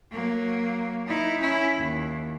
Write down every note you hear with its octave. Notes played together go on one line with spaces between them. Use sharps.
F#3 A#3
D#4 E4
C#4 E4
D#2